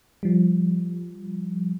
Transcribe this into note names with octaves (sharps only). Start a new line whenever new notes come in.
F3 G3